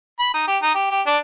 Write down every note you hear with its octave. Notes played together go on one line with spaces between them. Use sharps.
B5
D#4
G4
D#4
G4
G4
D4